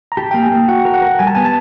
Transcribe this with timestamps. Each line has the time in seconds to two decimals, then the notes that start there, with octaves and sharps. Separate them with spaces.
0.12 A#5
0.17 G4 A5
0.31 A#3 G5
0.43 G#5
0.52 A#3
0.68 F#4 F#5
0.85 A#4
0.94 F#5
1.02 A#4
1.19 G3 G#5
1.27 A5
1.35 B3 G#5
1.45 A5